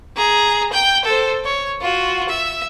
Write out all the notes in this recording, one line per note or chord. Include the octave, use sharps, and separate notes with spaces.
G#4 A#5
G5 G6
A4 C5
C#5
F4 F#4
E5